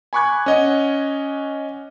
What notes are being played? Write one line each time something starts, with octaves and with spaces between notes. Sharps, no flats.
G#5 B5 C#6 D6 F#6 G#6
C#4 D#5 F#5